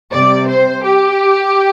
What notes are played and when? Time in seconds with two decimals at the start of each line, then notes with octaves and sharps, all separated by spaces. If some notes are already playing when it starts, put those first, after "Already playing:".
0.12 C3 G3 C4 D5
0.48 C5
0.84 G4